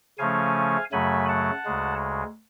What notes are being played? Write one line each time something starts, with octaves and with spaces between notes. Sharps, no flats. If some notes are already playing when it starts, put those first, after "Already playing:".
C#3 F3 A3 C#4 F5 G#5
F#2 C#3 F#3 A3 G#5 B5
F#5 A5
D2 C#3 G#3